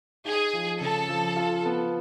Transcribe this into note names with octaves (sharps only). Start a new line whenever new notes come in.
D#4 G#4
F3
C#3 A4
F3
F4
B3